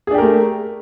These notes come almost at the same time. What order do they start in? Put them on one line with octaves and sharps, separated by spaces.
G#4 D4 G4 A#4 A3